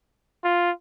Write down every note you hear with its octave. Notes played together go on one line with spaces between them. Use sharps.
F4